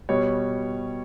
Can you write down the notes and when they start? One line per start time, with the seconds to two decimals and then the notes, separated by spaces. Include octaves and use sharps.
0.09 B2 G3 C#5